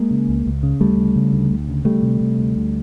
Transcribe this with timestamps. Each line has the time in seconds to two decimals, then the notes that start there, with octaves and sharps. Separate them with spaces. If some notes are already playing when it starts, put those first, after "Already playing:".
Already playing: G#3 A#3
0.11 C#3
0.28 C#2
0.46 C#2
0.63 C#3
0.81 D2 G3 A3
0.98 C#3
1.16 C#3
1.33 D2
1.51 D2
1.68 C#3
1.85 D2 G3 A3
2.02 C3
2.21 C3
2.39 D2
2.56 D2